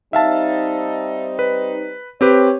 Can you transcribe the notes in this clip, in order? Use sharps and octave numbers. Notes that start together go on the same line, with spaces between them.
G3 C4 D#4 E5 F5 A5
B4
C4 G4 B4 C#5